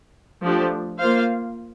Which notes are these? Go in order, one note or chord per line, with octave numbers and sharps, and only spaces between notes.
F3 A3 D4 G4
A#3 F4 C5 F5